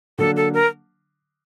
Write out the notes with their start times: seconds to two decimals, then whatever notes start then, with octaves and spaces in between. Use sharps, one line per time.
0.19 D3 F#3 A#3 D4 A4
0.37 A4
0.54 A#4